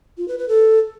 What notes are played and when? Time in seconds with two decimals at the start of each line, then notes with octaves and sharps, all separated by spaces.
0.18 F4
0.28 B4
0.38 B4
0.48 A4